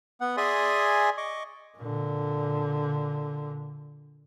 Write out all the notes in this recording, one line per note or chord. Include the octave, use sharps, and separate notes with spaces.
B3 F#5
G#4 D5 E5 G#5 C6 D#6
D#5 C#6 D6
A#2 D3